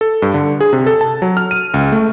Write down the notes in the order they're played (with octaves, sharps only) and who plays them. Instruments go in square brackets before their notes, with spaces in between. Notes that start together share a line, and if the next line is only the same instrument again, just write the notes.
[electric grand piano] A4
G2
D3
G#4
C3
A4
A5
F#3
F6
D#7
C#2
A3